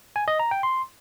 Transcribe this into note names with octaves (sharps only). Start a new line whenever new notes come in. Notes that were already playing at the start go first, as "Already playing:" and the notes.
G#5
D#5
A#5
G5
C6